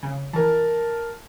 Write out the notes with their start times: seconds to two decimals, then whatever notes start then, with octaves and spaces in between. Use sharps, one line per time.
0.03 C#3
0.33 E3 A#4 A5